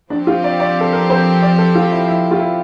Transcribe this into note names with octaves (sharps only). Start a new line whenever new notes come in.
F3 C4 D4 G4
F4
D5
D5
A4
A#4
C5
D5
A4
F4
E4
E4
F4
E4